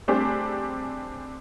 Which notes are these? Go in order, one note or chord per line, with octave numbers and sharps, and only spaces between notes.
G3 A3 C4 D4 G4 G#4